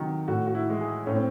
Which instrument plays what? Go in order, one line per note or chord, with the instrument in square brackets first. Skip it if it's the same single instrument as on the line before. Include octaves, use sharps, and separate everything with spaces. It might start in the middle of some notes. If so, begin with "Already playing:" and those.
Already playing: [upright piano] C3 D#3 F#3
A2 F#4
F#4
E4
E3 G#3
G#4
A2 C#4
C4